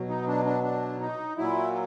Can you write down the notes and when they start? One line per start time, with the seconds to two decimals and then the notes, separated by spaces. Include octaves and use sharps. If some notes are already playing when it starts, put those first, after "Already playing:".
Already playing: B2 F#3
0.09 D#4
0.27 D4
0.45 D4
0.64 D4
1.01 D#4
1.37 A#2 F#3 E4